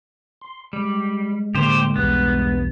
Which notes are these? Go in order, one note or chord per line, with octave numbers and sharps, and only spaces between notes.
C6
G3 G#3
A2 D3 A#3 G4 C5
B1 E2 G2 B3